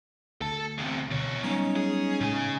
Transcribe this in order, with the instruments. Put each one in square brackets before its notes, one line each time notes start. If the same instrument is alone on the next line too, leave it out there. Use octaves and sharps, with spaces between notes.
[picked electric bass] D2 [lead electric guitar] A4 A5
[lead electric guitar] E2 C3
[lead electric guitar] E2 C#5 [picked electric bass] B2 D3
[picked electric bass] F#3 G3 B3 [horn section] C#4 D#4
[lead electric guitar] G#4
[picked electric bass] A2 G#3 [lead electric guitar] C#3 G#5